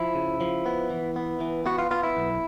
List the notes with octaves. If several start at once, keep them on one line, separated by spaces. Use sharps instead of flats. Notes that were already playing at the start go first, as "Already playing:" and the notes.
Already playing: F3 E4
C#3
F3
B3
E3
B3
E3
B3 F#4
F4
B3 F4
E4
B1